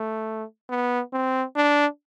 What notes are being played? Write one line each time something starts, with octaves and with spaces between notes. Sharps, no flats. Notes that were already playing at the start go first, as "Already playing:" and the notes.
Already playing: A3
B3
C4
D4